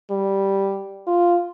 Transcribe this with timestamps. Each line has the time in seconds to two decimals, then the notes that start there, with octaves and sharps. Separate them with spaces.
0.11 G3
1.07 F4